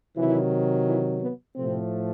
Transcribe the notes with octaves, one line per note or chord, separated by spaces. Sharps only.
C3 D#3 E3 F#3 E4
E3 E4
B3
A2 C3 F3 A3 C4